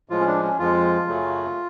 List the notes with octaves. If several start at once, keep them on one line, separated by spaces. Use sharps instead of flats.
A2 F3 G#3 F4
C#4
D4
C#4
F2 F3 G#3 F4
F#2 C#3 F#3 A3